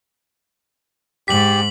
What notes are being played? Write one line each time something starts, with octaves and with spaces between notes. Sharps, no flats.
G#2 G4 B6 F#7